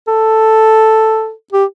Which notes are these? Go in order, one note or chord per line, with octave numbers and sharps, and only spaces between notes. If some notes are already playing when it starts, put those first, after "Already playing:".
A4
G4